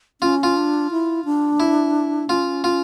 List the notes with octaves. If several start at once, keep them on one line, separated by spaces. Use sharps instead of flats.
C#4 F4
F4
D4
E4
D4
E4
C#4 F4
F4